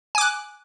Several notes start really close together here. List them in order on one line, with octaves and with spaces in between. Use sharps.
G#5 D6 F#6